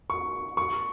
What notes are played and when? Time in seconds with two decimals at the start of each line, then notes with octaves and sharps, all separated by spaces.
0.10 C#6
0.57 C#6